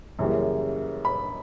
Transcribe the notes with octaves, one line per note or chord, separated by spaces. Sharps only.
F#2 C#3 E3 G3 A#3
B5